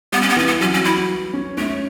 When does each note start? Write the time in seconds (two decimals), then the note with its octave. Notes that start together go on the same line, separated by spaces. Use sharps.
0.12 G3 B3
0.22 C#4
0.29 B3
0.36 E3 C#4
0.47 B3
0.61 F#3 C#4
0.74 C#4
0.85 E4
1.34 C#4
1.57 A3 C#4